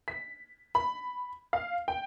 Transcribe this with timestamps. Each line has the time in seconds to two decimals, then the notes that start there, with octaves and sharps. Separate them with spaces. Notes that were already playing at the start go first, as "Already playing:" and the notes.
0.08 B6
0.75 B5
1.53 F5
1.88 G5